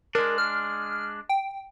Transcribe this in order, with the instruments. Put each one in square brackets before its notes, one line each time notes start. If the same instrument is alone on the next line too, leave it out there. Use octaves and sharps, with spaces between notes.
[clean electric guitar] G#3 D4 [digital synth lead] A#4
[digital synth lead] F6
G5